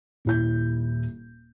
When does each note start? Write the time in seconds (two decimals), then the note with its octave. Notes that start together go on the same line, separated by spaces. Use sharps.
0.25 D#1 E4 G6